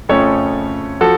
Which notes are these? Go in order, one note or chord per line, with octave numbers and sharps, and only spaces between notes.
F2 C#3 F3 A3 C#4 A4 C#5
F3 F#4 A4